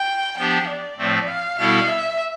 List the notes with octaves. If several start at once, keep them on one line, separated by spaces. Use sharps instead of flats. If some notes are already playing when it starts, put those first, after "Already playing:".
Already playing: G5
F3 B3 D4 G4 G5
D5
A2 F3 A3 C4
F5
B2 G3 B3 E4 A4 F5
E5